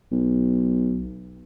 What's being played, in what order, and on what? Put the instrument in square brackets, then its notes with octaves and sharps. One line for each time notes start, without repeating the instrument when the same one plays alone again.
[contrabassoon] B1